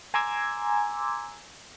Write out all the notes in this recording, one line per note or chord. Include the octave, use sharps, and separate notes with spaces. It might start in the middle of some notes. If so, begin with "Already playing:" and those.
G#5 A#5 C6 D6 E6 G#6